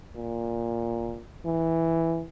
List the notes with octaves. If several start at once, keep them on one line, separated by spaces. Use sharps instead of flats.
A#2
E3